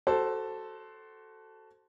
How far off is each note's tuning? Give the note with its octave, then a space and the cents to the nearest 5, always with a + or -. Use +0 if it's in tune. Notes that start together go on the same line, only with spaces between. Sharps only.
F#4 +20 A4 +0 C5 +0